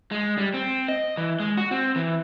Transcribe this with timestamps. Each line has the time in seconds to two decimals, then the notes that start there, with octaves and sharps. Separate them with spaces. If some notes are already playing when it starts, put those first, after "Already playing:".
0.11 G#3
0.38 G3
0.54 C4
0.88 D#5
1.17 E3
1.40 G#3
1.57 F#4
1.71 C4
1.96 E3